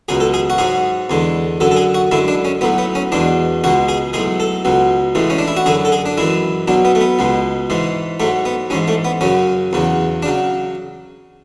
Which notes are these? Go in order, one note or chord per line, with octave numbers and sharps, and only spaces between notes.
C#2 B2 F#3 G#4
A4
G#4
F#4
G#2 F#3 G#4
E2 D3 G#3
F#2 D3 F#3 A4
A4
G#4
F#4
F#2 D3 G#3 E4
D4
C#4
B1 A2 F#3 B3
B3
C#4
E2 B2 G#3 D4
C#2 B2 G#3 F#4
G#4
B1 A2 G#3 G#4
A4
C#2 B2 F#3
A1 A2 E3 G#3
C#4
D4
E4
F#4
F#2 D3 F#3 G#4
A4
G#4
D4
F#2 E3 G#3 E4
B1 B2 F#3 D4
B3
A3
B3
C#2 B2 G#3
G#2 E3 G#3
G#2 F#3 A3
B3
A1 G#2 G#3 C#4
A3
B3
F#2 C#3 F#3 C#4
E2 C#3 F#3
D4
C#3 F#3